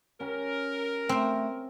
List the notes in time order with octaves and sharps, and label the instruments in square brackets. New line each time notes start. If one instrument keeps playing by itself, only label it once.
[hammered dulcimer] C#4 G4 [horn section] A#4
[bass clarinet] A3 [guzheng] C4 C5